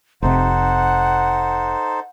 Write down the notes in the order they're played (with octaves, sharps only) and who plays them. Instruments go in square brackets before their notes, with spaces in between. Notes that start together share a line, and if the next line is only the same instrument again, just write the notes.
[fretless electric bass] F1 C3 [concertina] D#4 A4 C5 [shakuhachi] F#5